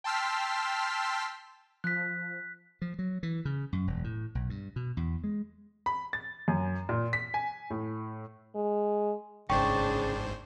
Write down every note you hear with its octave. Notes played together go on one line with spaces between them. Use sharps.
G5 A5 C6 E6 F6 B6
F3 F#6 B6
F3
F#3
E3
C#3
F#2
E1
A2
B1
G2
B2
E2
G#3
B5
A6
F#2
A#2
B6
G#5
A2
G#3
G#1 G#2 C#3 D4 C5 G5 C#6